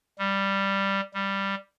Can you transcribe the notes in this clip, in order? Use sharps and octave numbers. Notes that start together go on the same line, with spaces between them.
G3
G3